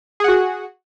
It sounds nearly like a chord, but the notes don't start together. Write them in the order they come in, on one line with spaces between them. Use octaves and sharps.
G#4 F#5 F#4